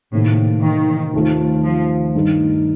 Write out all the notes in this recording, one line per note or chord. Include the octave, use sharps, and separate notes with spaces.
A2 C3 D#3 A#3
D#3
D#2 D#3 A3 C4 F4
F3
G2 D#3 A3 D#4